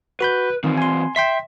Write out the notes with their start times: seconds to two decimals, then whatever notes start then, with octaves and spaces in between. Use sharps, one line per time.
0.20 F#4 B4 B5 G6
0.64 D#3 E3 C4
0.78 G#5 C6
1.16 E5 G5 C6 B6